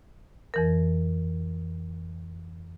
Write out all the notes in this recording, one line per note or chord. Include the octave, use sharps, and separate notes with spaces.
F2 E3 A#4